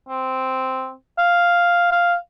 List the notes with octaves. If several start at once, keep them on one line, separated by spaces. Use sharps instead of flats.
C4
F5
F5